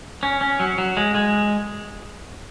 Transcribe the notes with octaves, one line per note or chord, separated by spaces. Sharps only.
C#4
C#4
F#3
F#3
G#3
G#3